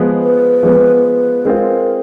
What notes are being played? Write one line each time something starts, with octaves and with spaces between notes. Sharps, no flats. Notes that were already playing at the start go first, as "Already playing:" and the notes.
Already playing: F3 G#3 B3
B4
F3 G#3 B3
G#3 C4 F4 A#4